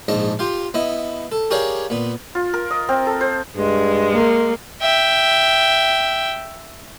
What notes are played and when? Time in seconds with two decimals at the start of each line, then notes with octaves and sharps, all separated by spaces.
0.08 A#1 G#2 D#5 A5
0.39 F4 G4 F5
0.74 B3 E4 D#5
1.32 A4
1.51 G4 G#4 A#4 C#5 D5 F5
1.90 A#2 B3
2.35 F4
2.54 A#4
2.71 D#5
2.89 C4
3.07 A4
3.21 C5
3.57 G2 G#3
4.13 A#3
4.82 E5 G5